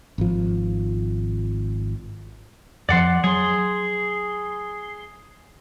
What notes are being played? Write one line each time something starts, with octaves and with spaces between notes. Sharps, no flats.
G#1 F3
F2 F3 D5 F#5 C6
F#3 G#4 C6